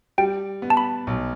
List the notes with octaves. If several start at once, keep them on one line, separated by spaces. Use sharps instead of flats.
G3 G5
B3
A5
B5
B1